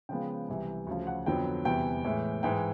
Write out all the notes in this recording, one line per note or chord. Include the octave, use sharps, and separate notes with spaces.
C#3 F3 G#3 B3 G5
C2 C3 E3
D2 C#3 F3
F#5
F2 D3 F#3 B3 G5
E2 C3 E3 G3 B3 G5
A2 E3 G#3
G#2 E3 G#3 G5